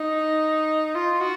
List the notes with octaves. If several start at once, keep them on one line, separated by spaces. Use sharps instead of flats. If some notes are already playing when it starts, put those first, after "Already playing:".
Already playing: D#4
F4
F#4